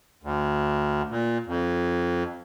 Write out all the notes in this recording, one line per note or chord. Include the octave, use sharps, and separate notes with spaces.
D2
A#2
F2